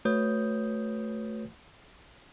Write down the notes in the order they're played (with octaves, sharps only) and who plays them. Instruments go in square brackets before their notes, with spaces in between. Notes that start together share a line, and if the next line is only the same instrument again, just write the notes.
[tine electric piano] A3 F#4 B4 C#5 D#6 G6